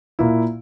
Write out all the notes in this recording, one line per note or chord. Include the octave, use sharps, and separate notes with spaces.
A#2 A#3 E4